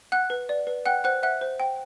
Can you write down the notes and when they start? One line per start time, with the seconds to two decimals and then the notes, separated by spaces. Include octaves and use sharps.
0.12 F#5 F#6
0.30 B4
0.49 D5
0.67 B4
0.86 F#5 G5 F#6
1.04 C5 F#5 F#6
1.23 E5 F#5 F#6
1.41 C5
1.60 G5